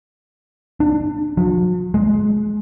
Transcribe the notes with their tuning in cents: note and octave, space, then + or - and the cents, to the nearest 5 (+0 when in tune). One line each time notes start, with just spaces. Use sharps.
D4 +25
F#3 -45
G#3 +20